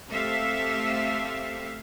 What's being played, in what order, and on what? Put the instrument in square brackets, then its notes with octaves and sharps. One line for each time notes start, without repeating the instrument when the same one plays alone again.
[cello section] A3 C4 G4 A4 E5 F5